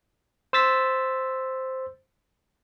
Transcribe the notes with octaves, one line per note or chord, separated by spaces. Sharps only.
C5 E6 A6 B6